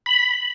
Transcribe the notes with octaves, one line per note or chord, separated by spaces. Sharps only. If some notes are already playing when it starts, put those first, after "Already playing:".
B5